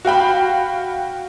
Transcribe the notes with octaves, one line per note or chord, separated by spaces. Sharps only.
F#4 F5 G5 B5